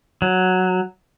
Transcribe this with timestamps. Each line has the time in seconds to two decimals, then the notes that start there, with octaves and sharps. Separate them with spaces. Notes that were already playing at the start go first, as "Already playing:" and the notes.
0.22 F#3